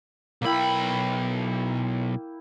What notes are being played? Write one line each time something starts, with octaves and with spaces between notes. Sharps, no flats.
B1 A#3 E4 G5 B5